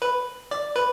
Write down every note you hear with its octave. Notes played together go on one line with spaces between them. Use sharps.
B4
D5
B4